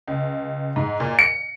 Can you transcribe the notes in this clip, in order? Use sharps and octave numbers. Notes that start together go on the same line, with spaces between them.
C#2
G#2
A#2
C#7